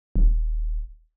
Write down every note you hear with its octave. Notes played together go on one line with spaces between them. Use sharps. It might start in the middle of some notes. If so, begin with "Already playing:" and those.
D#1